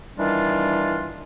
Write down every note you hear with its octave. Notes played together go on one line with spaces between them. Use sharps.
D#3 E3 G3 D4 F4